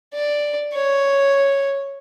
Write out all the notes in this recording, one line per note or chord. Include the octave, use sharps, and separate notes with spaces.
D5
C#5